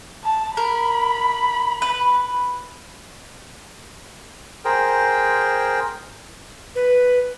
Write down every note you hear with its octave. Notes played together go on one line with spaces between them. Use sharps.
A5
A#4 B5
B4
G#4 A#4 C5 G5
B4